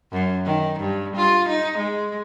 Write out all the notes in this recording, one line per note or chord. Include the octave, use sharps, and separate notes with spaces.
F#2
D#3
G2
F4
D#4
G#3